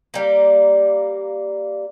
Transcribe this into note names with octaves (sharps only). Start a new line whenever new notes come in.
G3 A#3